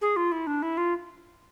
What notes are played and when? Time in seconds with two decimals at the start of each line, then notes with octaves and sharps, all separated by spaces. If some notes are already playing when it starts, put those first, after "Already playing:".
0.01 G#4
0.16 F4
0.32 E4
0.47 D4
0.62 E4
0.77 F4